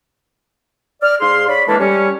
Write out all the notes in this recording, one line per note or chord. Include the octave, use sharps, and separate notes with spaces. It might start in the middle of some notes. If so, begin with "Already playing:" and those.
D5 F6
G#2 G#4 F5 C6
C#5 D5 B5
E3 G#3 A#3 D4 A4
G3 C#4